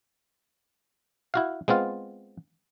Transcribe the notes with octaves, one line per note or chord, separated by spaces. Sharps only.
E4 F#4 F5
G#3 B3 C4 F4 F5